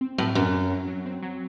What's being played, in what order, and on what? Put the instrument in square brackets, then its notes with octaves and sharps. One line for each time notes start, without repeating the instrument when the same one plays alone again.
[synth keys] C4
[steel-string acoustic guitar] A2 [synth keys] F#3
[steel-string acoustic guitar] F#2 [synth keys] F#3
[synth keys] F#3
F#3
F#3
C4
F#3